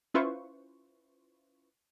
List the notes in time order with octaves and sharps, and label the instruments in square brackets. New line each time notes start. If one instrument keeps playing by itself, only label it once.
[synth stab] C#4 E4 F4 B4 C5 C#6